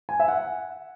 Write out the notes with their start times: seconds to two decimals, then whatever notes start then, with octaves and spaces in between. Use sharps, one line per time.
0.09 G#5
0.20 E5
0.28 F#5